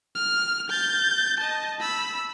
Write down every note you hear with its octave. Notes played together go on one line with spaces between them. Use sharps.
F6
G6 A6
D#5 A5
B5 E6